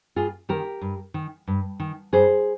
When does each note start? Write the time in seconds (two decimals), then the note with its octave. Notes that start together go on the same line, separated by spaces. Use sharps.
0.16 G2 F4 G#4
0.49 D#3 G4 A#4
0.81 G2
1.14 D#3
1.47 G2
1.80 D#3
2.13 G2 G#4 C5